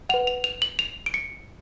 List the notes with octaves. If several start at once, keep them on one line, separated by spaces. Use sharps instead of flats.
B4 F#5 F7
F7
F7
F#7
F7
D7
C#7